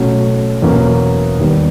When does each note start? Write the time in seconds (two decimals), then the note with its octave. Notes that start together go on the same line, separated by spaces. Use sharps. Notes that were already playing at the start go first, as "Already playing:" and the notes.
Already playing: B2 F#3 A3 C#4
0.62 E2 B2 F#3 A#3 C#4
1.39 D#2 D#3 G3 B3